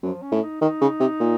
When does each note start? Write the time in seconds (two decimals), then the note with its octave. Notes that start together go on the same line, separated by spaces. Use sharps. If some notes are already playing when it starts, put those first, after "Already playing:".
0.03 F#2 F3
0.22 C#4
0.32 A2
0.43 D#4
0.61 D#3 D#4
0.81 C#3
1.00 C3
1.20 A#2